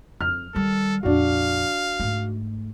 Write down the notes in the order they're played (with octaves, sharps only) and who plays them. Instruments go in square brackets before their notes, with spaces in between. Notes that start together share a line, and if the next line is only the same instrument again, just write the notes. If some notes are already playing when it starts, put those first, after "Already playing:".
[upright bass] F2 [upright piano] F6
[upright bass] D#3 G3 [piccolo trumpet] A4
[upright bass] A#1 F2 [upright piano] D4 F#4 [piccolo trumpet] F5
[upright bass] G#2 A3